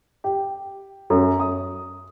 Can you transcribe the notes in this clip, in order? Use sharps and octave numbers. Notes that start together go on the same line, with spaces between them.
G4
F#2
D#6